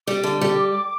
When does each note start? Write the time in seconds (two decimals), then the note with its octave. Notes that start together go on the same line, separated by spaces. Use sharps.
0.07 G3 D6
0.23 D3
0.41 G3